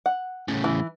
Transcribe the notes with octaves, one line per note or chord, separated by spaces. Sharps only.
F#5
A2 C#3
E3